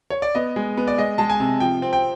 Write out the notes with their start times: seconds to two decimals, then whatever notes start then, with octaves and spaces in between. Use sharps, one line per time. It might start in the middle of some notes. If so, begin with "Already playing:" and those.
0.10 C#5
0.22 D5
0.35 B3 D#5
0.56 G#3
0.77 B3
0.88 D5
0.98 G#3 D#5
1.18 G#3 A5
1.30 G#5
1.40 C3
1.60 F3 G5
1.82 C4
1.93 G5